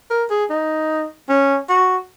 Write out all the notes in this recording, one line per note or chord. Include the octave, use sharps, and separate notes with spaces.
A#4
G#4
D#4
C#4
F#4